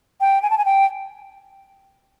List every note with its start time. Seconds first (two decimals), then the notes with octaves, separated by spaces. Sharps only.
0.21 G5
0.42 G#5
0.50 A5
0.58 G#5
0.65 G5